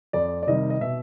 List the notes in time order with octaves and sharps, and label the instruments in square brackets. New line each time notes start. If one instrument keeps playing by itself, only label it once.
[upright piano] F2 D5
D5
C3 D#3 G3 D#5
D#5
B2 E5